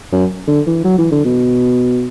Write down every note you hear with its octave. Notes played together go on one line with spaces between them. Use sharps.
F#2
D3
E3
F#3
E3
D3
B2